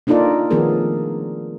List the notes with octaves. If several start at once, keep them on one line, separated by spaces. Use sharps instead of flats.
A#3 D4 D#4 F4 A4 D5
D#3 F3 A3 B3 G#4 A#4